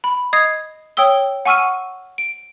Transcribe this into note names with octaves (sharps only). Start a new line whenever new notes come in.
B5
D#5 D#6 G#6 C7
C#5 G5 D#6 E6 G7
F#5 G#5 C#6 E6 F6 D#7
D7